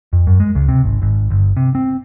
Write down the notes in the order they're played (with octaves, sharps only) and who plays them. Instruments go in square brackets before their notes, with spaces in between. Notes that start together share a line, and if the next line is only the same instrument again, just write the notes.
[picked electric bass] F2
F#2
G#3
C#2
C3
G#1
G#1
G1
C3
C4